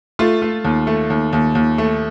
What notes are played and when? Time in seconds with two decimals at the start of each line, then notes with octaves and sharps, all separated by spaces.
0.19 A3 F4
0.42 A3
0.64 D#2
0.87 A3
1.10 D#2
1.33 D#2
1.55 D#2
1.78 A3